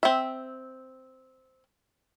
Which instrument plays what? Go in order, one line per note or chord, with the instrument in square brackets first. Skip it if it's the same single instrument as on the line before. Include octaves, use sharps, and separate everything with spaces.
[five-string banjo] C4 E5